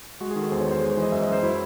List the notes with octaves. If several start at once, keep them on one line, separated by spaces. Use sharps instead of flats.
G#3 F#4
D#3 G#4
A4
E2 C5
C#5
E2 C5
G#3 G#4
C5
E3
D#5
F#2 E5
F#2 D#5
C5
F#3 E4